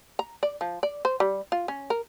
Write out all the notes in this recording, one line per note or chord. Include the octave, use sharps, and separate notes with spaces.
A#5
D5
F3
D5
C5
G3
F4
C#4
A#4